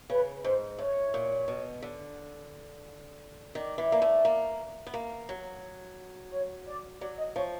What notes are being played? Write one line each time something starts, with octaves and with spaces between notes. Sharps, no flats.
C#3 B4
G#2 C5
A2 C#5
A#2
B2
D3
D#3 D5
E3
A#3
A3
A#3
B3
A#3
F#3
C#5
D5
F#3 D5
D#5
F3 C#5